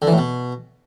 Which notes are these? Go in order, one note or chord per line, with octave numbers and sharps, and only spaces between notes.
D3
E3
A2
B2